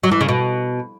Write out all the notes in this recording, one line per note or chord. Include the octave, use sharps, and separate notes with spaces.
F#3
E3
C#3
B2